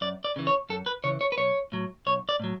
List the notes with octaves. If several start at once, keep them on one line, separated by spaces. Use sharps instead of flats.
F#2 D5
D5
C#3 E3
C#5
F#2 A4
B4
C#3 E3 C#5
C#5
B4
B1 C#5
A2 F#3
B1 C#5
D5
A2 F#3